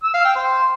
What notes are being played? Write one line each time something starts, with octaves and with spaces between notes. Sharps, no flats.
E6
F5
G5
C5